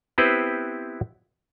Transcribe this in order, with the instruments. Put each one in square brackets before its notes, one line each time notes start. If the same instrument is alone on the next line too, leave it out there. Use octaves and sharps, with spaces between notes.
[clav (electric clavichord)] B3 C4 E4 G4 B4 C5